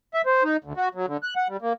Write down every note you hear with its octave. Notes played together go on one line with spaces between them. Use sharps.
E5
C5
D#4
D2
F#4
F#3
D3
F#6
F#5
G3
A#3